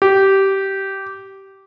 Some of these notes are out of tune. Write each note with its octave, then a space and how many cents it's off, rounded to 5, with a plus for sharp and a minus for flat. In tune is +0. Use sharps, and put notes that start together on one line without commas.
G4 -15